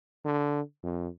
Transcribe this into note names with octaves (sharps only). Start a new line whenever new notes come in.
D3
F2